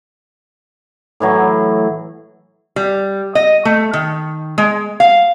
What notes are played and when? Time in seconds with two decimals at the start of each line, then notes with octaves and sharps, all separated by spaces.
1.20 A2 E3 F#3
2.76 G3
3.35 D#5
3.65 A3
3.93 D#3
4.58 G#3
5.00 F5